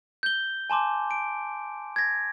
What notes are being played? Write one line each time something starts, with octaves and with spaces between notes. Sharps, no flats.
G6 G7
G#5 A5 C6 D6
D7
G#6 A#6